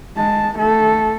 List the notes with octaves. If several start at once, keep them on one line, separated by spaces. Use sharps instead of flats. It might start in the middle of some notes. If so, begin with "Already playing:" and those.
G#3 A5
A3 A4